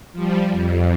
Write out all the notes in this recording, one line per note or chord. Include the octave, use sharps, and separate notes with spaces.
F3 G3
F2